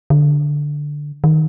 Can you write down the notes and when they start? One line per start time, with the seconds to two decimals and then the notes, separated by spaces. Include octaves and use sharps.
0.10 D3
1.24 D#3